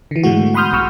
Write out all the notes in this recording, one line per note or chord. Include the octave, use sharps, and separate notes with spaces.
D3 E3
G#2 B2 G#3 A3 F#4
F#5 B5 C6 D#6 F6 G6
B1 B2 C#6 E6 F6